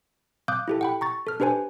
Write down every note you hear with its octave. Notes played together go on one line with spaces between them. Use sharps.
F5 D6 D#6 F#6 G6
E4 G4 A4
F#5 G5 B5
A#5 C#6 A6
A4 F6
D4 G4 B4 C5 G#5